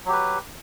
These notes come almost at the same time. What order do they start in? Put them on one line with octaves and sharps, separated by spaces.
F#3 G4 B4